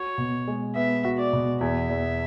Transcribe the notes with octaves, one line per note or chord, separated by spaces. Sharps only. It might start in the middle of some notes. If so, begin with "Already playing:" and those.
Already playing: F#4 C#5
B2
G#3
B3 E5
F#4
D5
B2
E2 E5
E2